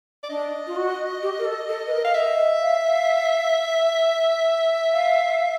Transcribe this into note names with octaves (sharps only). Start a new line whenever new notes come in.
D5
D4 D#5
F4
F#4
G4
A#4
A4
A4
B4
A#4
F5
D#5 E5
F5
F5
F5